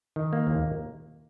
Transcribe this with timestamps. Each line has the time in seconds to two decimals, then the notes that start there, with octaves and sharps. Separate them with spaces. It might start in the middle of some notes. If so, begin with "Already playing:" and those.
0.16 D#3
0.33 A#3
0.47 D#2